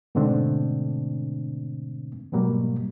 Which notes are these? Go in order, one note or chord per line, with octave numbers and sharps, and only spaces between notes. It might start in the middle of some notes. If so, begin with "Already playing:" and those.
G#2 B2 D3 A3 C4 D4
G#2 B2 F#3 G3 A#3